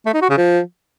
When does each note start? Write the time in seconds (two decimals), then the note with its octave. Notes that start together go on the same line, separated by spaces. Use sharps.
0.06 A3
0.14 D#4
0.22 F#4
0.29 C#3
0.37 F3